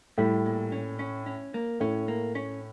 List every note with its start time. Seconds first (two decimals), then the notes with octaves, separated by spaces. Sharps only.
0.18 A2 G3
0.46 A#2
0.72 C#4
0.99 C#4
1.26 C#4
1.54 A#3
1.80 A2 C#4
2.08 A#3
2.35 C#4